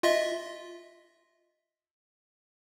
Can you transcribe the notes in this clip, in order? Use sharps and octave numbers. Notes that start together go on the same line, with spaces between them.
F4 D#5 E5